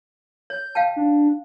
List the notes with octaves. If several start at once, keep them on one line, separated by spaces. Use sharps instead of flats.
C#5 G6
F5 G5 A5
D4